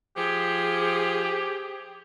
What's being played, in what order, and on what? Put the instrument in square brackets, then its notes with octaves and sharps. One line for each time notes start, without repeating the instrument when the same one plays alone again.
[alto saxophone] F3 [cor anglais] G4 [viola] G#4